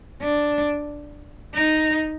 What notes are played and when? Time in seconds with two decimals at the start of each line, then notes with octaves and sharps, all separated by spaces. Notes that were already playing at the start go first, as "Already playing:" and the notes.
0.22 D4
1.54 D#4